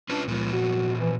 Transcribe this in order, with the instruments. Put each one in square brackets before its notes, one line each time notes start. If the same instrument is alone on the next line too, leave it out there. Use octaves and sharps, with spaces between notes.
[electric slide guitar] C#4 F4 B4 [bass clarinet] D4
[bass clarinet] C#2 [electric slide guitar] A#2 F3 B3
[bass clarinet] F#4
E3